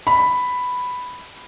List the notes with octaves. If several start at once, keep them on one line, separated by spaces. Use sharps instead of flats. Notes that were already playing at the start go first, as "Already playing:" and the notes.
B5